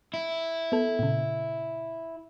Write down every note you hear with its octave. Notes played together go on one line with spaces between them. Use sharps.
E4
B3 A4
A#2 C#3